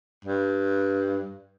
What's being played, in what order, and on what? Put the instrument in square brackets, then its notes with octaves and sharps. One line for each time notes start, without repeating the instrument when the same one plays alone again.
[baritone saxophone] G2